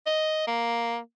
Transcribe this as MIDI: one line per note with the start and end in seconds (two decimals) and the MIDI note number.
0.07 0.46 75
0.47 0.98 58